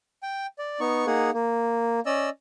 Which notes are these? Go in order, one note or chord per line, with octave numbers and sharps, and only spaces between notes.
G5
D5
B3 D#4 C#6
A#3 D#4 G#4 F#5
A#3
C#4 D5 D#5 E6